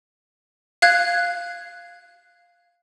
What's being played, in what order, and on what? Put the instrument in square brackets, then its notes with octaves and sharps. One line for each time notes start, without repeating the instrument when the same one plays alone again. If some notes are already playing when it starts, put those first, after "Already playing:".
[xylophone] F5 F#6 G#6